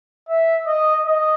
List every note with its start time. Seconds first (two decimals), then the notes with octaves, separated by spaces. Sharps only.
0.29 E5
0.67 D#5
1.06 D#5